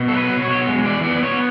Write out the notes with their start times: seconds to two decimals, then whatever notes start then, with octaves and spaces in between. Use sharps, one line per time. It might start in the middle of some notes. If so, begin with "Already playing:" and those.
Already playing: B2
0.08 F#3 A4
0.17 B4
0.30 F#3
0.42 C#5
0.48 B2
0.67 G#3
0.86 E3 D5
1.04 B3 D5
1.23 B3 C#5